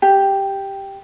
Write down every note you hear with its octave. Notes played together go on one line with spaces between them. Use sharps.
G4